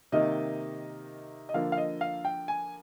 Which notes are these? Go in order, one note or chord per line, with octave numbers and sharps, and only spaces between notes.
C3 D#3 A#3 D#4 D#5
D#5
D3 F3 A#3 F5
F5
D#5
F5
G5
G#5